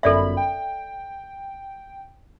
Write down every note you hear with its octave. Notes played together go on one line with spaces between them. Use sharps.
G1 F#2 A4 D5 E5 B5
G5